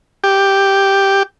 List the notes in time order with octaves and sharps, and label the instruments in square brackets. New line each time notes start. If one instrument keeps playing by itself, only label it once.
[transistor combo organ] G4